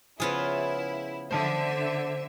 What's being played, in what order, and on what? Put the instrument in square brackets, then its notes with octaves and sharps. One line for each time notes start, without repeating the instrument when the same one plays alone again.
[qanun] C#3 F3 C#6 [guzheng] B3 F4 G#4 [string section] E4
[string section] D3 E5 [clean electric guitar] C5 A5